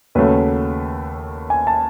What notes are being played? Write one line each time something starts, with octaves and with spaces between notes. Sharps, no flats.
D#2 C#3 F#3 A3 B4
G#5
A5